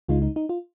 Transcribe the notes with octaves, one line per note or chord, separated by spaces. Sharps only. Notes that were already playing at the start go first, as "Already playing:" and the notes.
C#2 C#3 G#3 D#4 F4
D#4
D#4
F4